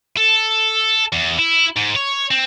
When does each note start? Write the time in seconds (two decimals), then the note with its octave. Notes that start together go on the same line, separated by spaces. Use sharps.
0.17 A4
1.13 E2
1.39 E4
1.76 G#2
1.96 C#5
2.31 C4